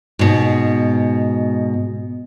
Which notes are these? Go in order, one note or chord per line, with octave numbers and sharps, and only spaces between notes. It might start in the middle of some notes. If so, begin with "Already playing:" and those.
G#2 B2